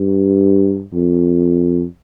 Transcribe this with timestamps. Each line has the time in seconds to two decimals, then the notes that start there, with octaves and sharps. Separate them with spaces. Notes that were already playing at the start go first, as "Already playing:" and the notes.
Already playing: G2
0.93 F2